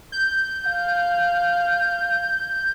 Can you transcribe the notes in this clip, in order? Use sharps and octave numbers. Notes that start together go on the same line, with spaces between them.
G6
F5